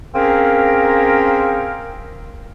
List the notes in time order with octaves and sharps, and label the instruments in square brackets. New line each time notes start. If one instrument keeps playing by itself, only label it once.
[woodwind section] A#3 C4 C#4 G#4 A#4